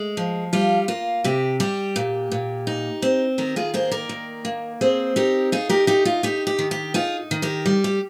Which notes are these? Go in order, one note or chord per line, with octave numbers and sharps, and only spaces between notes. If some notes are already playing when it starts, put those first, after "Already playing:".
Already playing: G#3
F3
G3 F4
A#3 F4
C3 G4
G3 G4
A#2
A#2
D#4
C4
D#3 G4 A#4
F4 G#4
A#3 G#4 C5
A#4 D5
D#3
A#3
C4 G#4 C5
D#4 G4 A#4
D#4 F4 G#4
G4 A#4
D#4 G4
F4
D#4 G4
G4
D#3
G4
D#4 F4 G#4
D#3
G4 A#4
G3
G4